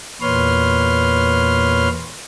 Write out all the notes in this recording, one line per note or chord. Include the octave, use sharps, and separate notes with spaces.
E2 A#2 B4 C#5 C6 F6